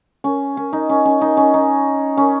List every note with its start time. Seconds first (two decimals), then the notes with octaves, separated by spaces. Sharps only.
0.24 C#4
0.57 C#4
0.73 D#4
0.89 C#4
1.05 C#4
1.21 D#4
1.37 C#4
1.54 D#4
2.17 C#4